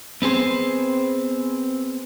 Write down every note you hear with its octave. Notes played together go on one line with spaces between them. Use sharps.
B3 C4 G#4 C5